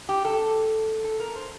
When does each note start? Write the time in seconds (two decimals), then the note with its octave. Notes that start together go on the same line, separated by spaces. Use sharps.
0.09 G4
0.25 A4
1.04 A4
1.20 A#4
1.36 C5